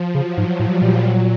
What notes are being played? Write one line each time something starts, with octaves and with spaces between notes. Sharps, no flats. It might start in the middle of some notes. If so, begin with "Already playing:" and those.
Already playing: F3
C#3 F#3
G#2
A2 G3
A#2
F#3